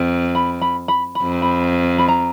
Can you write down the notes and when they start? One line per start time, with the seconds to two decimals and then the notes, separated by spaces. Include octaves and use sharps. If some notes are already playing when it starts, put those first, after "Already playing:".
Already playing: F2
0.35 B5
0.62 B5
0.88 B5
1.15 B5
1.22 F2
1.42 B5
1.99 B5
2.08 A#5